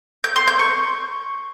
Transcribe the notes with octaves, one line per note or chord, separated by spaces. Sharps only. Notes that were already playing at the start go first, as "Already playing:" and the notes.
G6
C6
G6
C#6